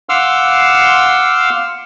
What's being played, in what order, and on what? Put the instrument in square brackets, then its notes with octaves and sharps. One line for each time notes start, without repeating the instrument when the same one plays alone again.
[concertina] F5 F#5 C6 D6 E6 F6